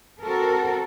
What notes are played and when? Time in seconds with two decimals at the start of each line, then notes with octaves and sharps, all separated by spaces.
0.22 C4 F#4 A4 A#4